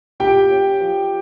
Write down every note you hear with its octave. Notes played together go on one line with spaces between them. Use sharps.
A#2 G4 G5
C#4
F3